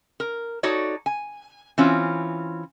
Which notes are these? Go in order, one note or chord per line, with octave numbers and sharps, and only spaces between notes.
A#4
D#4 F#4 A4 C#5 D5
G#5
E3 C4 C#4 F4